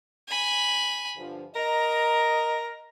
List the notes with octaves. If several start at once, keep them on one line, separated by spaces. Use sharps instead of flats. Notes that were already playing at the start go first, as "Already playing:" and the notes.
G#5 B5
G2 D3 F3
A#4 D#5 A#5